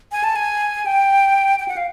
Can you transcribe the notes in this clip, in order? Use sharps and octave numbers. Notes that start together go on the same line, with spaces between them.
G#5
A5
G#5
G5
G5
F#5
F5